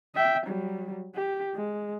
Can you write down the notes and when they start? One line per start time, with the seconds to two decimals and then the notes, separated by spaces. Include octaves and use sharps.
0.15 E5 G5
0.47 F#3 G3
1.15 G4
1.54 G#3